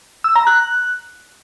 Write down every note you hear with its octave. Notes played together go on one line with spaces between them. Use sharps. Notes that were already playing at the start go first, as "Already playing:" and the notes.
E6
A#5
F#6